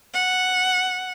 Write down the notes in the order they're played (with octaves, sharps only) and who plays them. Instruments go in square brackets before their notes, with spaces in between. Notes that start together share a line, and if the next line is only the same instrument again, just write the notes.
[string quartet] F#5